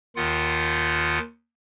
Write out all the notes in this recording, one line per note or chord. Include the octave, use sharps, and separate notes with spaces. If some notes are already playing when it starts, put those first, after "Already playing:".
D#2 D#3 F4 F#5